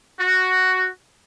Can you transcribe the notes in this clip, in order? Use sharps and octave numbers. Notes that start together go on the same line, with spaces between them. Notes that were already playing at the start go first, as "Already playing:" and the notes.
F#4